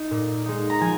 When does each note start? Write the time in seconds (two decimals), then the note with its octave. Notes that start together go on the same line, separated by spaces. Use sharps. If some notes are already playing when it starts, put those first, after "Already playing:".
Already playing: D#4
0.11 A#2
0.45 G#3 D#4
0.70 A#5
0.81 F3 G#5